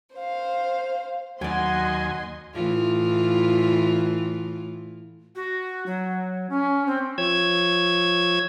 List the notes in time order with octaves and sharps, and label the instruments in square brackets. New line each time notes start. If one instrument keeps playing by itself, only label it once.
[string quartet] C5 F5
[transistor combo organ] D#2 G#5 [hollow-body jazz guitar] F#3 D5 [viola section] D#5 C6 [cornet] F#5
[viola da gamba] A2 E3 F4
[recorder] F#4
F#3
C#4
C4
[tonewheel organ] F3 C#5 E6 G#6